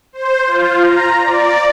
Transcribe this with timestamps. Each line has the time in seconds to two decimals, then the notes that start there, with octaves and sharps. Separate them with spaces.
0.13 C5
0.47 F4
0.81 A#5
1.20 D5